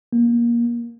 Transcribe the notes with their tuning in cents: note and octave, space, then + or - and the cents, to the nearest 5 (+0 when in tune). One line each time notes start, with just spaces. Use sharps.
A#3 +20